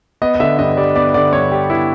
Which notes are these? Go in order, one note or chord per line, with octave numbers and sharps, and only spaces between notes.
B3 D#5
D#5
D3 E5
G2 D#5
G3 D5
B3 D5
D3 D5
G2 C#5
G3 G4
B3 E4